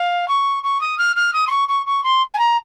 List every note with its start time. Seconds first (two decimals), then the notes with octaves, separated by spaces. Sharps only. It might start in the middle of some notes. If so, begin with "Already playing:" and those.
Already playing: F5
0.28 C#6
0.63 C#6
0.81 D#6
0.98 F6
1.16 F6
1.33 D#6
1.47 C6
1.50 C#6
1.68 C#6
1.86 C#6
2.03 C6
2.34 G#5
2.38 A#5